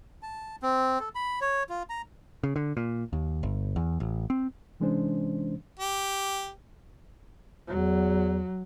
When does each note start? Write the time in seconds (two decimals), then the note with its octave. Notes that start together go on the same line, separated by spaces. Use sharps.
0.23 A5
0.62 C4
1.00 A4
1.15 B5
1.41 C#5
1.69 F4
1.90 A#5
2.43 C#3
2.56 D3
2.77 A#2
3.13 D#2
3.43 G1
3.76 E2
4.00 A1
4.30 C4
4.80 C3 E3 G#3 C#4 D4 C5
5.80 G4
7.68 E2 F#3